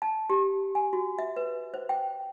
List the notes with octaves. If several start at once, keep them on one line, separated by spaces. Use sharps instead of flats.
A5
G4
G#5
F#4
E5
B4
C5
G5